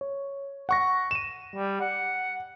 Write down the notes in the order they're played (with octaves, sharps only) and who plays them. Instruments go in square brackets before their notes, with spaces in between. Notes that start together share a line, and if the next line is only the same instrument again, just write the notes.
[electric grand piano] C#5
F#5 C#6 A#6
D#7 E7
[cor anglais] G3
F#5